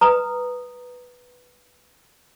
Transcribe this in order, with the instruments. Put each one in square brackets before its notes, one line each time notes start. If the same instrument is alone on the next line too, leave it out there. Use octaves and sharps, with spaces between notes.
[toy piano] B4 A#5 D#6